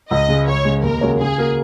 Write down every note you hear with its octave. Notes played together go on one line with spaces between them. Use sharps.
C#2 D#5
C#3 G#3
C#2 C#5
C#3 G#3
D#2 A#4
C#3 G#3 F#4 C#5
C#3 G#4
A#3 F#4 A#4